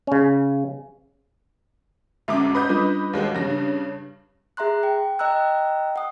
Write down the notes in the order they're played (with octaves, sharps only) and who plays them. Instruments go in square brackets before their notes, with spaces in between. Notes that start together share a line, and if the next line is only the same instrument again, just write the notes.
[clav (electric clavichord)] C#3 C#4
[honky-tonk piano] D2 G#2 D6 [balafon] C#4 E5
[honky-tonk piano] B4 D#5 G6
[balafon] G3 D4 F4
[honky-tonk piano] D#2 G#3 F#4
G2 C#3 A#6
[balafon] D4
[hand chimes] G#4 E5 A#5 C6 F#6
G5
D#5 G5 A#5 E6 F#6
F#5 D#6